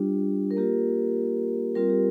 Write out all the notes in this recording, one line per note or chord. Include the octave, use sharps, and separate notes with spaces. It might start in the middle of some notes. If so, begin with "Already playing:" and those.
Already playing: G3 D4 F4 G4
A#4
A#3 F4 G4
G3 C4 F4 A#4
G4